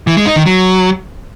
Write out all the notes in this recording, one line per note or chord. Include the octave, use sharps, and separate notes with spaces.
E3
G#3
D#4
D#3
F#3